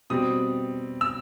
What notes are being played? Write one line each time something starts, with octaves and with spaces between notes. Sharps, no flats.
B2 G3 C4 D#6
E6